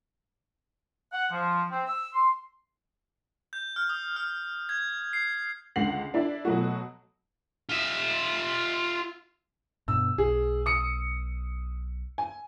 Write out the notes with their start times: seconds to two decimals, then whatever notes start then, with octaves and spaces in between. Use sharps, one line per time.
1.12 F#5
1.31 F3
1.70 C4
1.86 E6
2.13 C6
3.53 G6
3.76 F6
3.89 D#6
4.16 F6
4.69 G#6
5.13 C7
5.76 C#2 D3 F#5 C7 F#7
6.14 D4 E4 D5
6.45 B2 F#3 A3 F#4
7.69 F4 E5
9.88 G2 B2 E6
10.18 B1 G#4
10.66 D#6 C#7
12.18 G#5